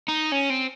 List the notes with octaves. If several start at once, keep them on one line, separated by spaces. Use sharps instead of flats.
D#4
C#4
C4